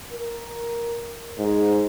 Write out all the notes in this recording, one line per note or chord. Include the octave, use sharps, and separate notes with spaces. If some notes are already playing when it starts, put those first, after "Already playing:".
A#4
G#2